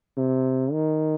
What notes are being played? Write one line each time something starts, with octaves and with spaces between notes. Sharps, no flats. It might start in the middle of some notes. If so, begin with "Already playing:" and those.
C3
D#3